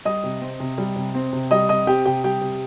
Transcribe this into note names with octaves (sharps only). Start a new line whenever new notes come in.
G3 D#5 D#6
C3
C4
C3
G3
C3
C4
C3
G3 D#5 D#6
C3 D#5 D#6
C4 G4 G5
C3 G4 G5
G3 G4 G5
C3